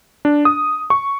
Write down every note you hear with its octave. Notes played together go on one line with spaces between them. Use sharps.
D4
D#6
C#6